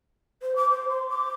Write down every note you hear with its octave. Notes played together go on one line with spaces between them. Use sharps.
C5
D6
C5
C6
D6